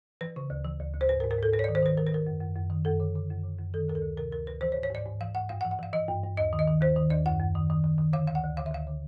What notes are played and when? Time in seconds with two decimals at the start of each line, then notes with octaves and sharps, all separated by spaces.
0.21 E3 B4
0.36 C#3
0.50 D2
0.65 E3
0.80 D2
0.94 D2
1.01 C5
1.09 G#2 B4
1.20 A#4
1.24 G#2
1.31 A#4
1.39 G#2 A4
1.53 G#2 B4
1.59 C#5
1.64 D5
1.69 D#3
1.75 C5
1.83 D#3 B4
1.97 D#3 A#4
2.07 B4
2.12 D#3 A#4
2.27 F#2
2.41 F#2
2.56 F#2
2.70 D#3
2.85 F#2 A4
3.00 D3
3.15 D3
3.30 F#2
3.44 D3
3.58 F#2
3.74 D#3 A4
3.88 D2 A#4
3.95 A4
4.02 D2
4.17 C3 A#4
4.32 D2 A#4
4.47 D2 B4
4.61 E3 C5
4.72 C#5
4.77 G#2
4.83 C#5
4.90 G#2 D5
5.06 G#2
5.21 E3 F5
5.34 G#2 F#5
5.49 G2 F5
5.61 F#5
5.65 E3
5.71 F#5
5.79 E3 F5
5.93 E3 D#5
6.08 G2
6.23 G2
6.37 D#2 D#5
6.53 D#3
6.59 D#5
6.67 D#3
6.81 D#2 C5
6.96 D#3
7.10 D#2 D5
7.26 F#2 F#5
7.40 F#2
7.55 D#3
7.70 D#3
7.84 D#3
7.98 D#3
8.13 D3 F5
8.28 D2 F5
8.35 F#5
8.44 D2
8.57 D3 F5
8.66 E5
8.72 D2 F5
8.87 D3